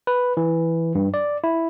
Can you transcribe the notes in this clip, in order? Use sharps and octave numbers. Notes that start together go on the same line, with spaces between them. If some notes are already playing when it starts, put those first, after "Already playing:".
B4
E3
G2
D5
E4